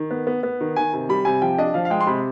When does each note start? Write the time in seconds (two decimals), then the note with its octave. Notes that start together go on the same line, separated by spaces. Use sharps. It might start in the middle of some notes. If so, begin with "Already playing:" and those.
Already playing: D#3
0.11 B3
0.27 B3
0.43 B3
0.61 D#3
0.76 D#3 G#5
0.93 C3
1.09 G3 B5
1.25 C3 G#5
1.42 F3 G5
1.58 D4 D#5
1.74 F3 F5
1.85 F5
1.90 G#3 G5
2.01 C6
2.07 C3 B5